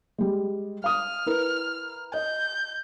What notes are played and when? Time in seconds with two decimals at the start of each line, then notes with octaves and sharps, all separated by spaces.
0.18 G3 G#3
0.84 F5 D#6 F6
1.26 E4 A#4 B4
2.14 D#5 G6